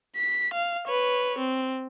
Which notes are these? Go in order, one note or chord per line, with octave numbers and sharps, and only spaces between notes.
B6
F5
B4 C#5
C4